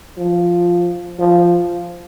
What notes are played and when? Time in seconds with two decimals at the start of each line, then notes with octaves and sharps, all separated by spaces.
0.18 F3
1.19 F3